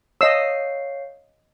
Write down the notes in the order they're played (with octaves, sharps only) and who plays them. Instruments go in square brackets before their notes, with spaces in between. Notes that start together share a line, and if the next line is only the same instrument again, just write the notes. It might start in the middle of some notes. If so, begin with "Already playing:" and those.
[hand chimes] C#5 F5 C7 [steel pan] D#5 E6